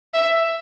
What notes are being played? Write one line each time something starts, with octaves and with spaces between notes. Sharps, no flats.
E5